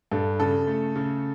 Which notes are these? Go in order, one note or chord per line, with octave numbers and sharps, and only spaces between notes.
G2 A4
C#3 A4
A3
C#3